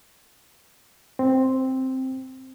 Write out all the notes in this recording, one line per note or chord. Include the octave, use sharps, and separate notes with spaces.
C4